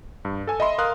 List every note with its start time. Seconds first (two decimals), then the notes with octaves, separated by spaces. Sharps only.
0.25 G2
0.47 A4 G#5 E6
0.60 D#5 E5 B5 C6
0.78 A#4 F5 A#5 C6 D#6 F#6